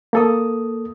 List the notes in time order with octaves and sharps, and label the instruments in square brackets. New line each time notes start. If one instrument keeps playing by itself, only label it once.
[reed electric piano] A#3 A4 D#6